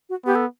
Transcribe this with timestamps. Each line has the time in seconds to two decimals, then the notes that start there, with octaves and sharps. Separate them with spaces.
0.09 F#4
0.26 B3 G4
0.35 A4